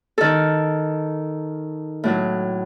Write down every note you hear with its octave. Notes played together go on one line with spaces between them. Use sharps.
D#3 A4
A2 F#3